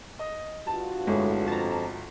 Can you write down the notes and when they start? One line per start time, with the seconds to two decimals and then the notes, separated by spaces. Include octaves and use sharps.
0.19 D#5
0.67 G2 F4 F#4 A5
1.07 G1 A2 G#3
1.48 F2 A5 A#5